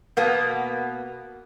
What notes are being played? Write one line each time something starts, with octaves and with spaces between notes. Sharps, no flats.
B2 A#3 B3